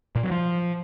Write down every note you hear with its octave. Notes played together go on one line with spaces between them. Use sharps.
A#2
F#3
F3